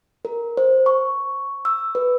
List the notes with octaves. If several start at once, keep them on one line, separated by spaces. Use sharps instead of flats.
A#4
C5
C#6
E6
B4